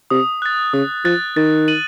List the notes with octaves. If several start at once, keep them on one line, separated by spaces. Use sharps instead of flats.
C3 D#6
F#6 A6
C#3 D#6
F3 F#6 A6
D#3 A6
D#7 F#7